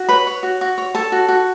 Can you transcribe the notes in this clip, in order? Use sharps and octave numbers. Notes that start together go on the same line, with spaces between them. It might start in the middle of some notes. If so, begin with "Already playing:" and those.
Already playing: F#4
B4 C#5 B5
C#5
F#4
F#4
C#5
A4 C#5 A5
F#4
F#4